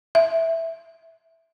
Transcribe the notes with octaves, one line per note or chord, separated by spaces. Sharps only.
E5